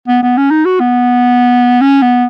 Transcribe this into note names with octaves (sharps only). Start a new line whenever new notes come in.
B3
B3
C#4
D#4
F#4
B3
C#4
B3